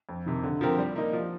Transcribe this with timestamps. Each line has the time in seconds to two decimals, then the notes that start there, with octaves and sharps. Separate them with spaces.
0.09 F2
0.26 C3 D#3
0.43 D3
0.61 F3 C4 G4 A#4
0.79 G3
0.96 A#3 D#4
1.13 F3